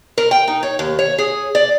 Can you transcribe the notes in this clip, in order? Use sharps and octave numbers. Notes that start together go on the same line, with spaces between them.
A#4
G5
D#4
C#5
D#2
C#5
G#4
D5